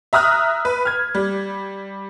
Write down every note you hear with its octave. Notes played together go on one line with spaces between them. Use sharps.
E5 A#5 D#6 F6 F#6
B4
F6 G#6
G3